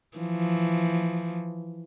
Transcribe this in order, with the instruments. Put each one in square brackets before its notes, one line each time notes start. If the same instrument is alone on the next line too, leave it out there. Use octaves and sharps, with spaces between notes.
[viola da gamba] E3 F3